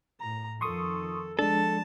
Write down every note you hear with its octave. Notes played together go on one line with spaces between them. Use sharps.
A2 A#5
F2 D#3 F3 A4 C6 C#6 D#6
F3 G#3 D4 A4 A5